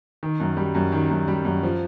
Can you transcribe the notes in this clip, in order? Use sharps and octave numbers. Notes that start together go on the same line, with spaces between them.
D#3
F#2
G3
F#2
D#3
F#2
G3
F#2
F3